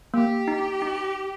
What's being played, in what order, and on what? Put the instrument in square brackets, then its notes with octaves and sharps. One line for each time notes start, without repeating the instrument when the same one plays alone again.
[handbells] A#3 [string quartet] G4
[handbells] D#4
D#4